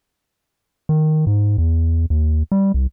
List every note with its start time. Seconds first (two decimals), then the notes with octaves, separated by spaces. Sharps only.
0.89 D#3
1.27 G#2
1.58 E2
2.10 D#2
2.52 G3
2.74 C2